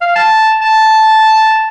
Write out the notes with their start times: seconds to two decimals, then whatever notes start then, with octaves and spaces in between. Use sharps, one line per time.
0.01 F5
0.16 A5
0.61 A5